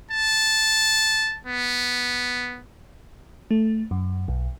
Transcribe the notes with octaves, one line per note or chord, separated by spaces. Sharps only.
A5
B3
A3
F#2
B1